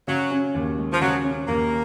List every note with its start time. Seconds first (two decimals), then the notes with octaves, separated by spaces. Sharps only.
0.08 C#3 F#3
0.31 C#4
0.55 D#2
0.78 G#3
0.93 F3
1.01 C#3 F#3
1.24 C#4
1.48 D#2 A#3